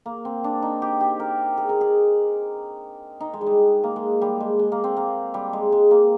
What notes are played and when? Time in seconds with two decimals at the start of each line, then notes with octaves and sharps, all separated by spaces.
0.06 A#3
0.25 C4
0.44 D4
0.62 D#4
0.82 G4
1.00 G4
1.20 A#4
1.57 G#4
1.69 A#4
1.81 G#4
3.20 D#4
3.33 G#3
3.41 G3
3.47 G#3
3.84 A#3
3.96 G#3
4.22 G3
4.40 G#3
4.59 G#3
4.72 A#3
4.84 C4
4.97 A#3
5.34 G3
5.53 G#3
5.72 G#3
5.91 A#3